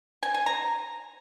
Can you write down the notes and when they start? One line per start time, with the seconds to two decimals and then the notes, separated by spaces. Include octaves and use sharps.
0.23 G#5
0.34 G#5
0.46 A#5